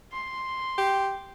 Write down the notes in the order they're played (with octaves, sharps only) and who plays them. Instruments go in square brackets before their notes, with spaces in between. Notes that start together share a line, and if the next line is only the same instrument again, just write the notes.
[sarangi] C6
[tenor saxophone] G4